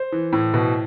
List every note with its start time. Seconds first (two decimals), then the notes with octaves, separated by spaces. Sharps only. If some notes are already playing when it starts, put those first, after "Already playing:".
Already playing: C5
0.12 E3
0.33 A2
0.54 B2